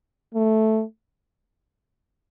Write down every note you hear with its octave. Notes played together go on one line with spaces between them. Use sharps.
A3